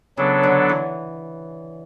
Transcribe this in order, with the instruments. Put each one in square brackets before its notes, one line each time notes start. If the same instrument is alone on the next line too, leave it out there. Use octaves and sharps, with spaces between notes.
[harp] C#3 [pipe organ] F#3 B3 D4 A4
[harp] D3
E3